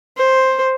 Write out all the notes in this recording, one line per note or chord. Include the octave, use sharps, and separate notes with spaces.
C5